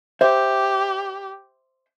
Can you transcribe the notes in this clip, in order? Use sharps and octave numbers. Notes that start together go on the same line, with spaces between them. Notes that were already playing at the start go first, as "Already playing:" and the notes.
G4 C5 E5